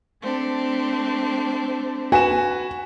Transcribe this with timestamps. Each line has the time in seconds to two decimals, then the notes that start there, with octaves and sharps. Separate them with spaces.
0.21 A3 C4 D4
2.12 F#4 B4 G#5 E7